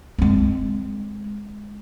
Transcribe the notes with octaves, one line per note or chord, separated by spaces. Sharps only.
G#3 C4